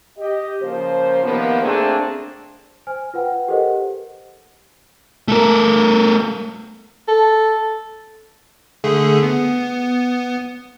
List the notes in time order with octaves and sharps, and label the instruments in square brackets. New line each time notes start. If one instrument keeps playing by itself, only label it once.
[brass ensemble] G4 D#5
C#3 F3 A#3 C5
C3 D#3 F3 A#3 B3
A3 A#3 C4 D4 G#4 C5
[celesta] C5 G#5 F6
F4 B4 F#5 G5
G4 A4 A#4 C5 D#5 F#5
[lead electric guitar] A3 A#4
[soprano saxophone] A4
[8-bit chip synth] D3 A3 G#4
B3